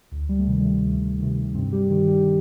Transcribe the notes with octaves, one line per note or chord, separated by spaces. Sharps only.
D2
G3
A3
C3 D#3 G3
G3
A3
D2
C3 D#3
G2 C3 C4
G3 G4
D#3 G3 G4
G3 G4